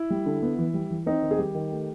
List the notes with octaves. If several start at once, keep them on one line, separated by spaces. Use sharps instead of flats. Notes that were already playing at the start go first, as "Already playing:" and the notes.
Already playing: E4
G3
D3
B3
E3
G3
E3
C4 D#4
D#3
G#4
G3 G4
D#3
A3